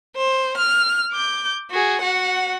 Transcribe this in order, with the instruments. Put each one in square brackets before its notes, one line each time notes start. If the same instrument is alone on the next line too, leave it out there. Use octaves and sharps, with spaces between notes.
[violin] C5
F6
D6 G6
F#4 G#4
F#4 F#5